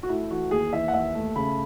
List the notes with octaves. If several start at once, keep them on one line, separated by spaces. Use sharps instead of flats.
F#4
A3 E4
E3 F#4
D#2 G#4
E3 E5
F#5
D#2 E5
A3
C#3 B5